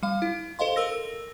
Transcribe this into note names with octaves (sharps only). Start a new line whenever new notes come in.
G3 F5
E4
A4 C5 D#5 F5 C6
A#4 E6 A#6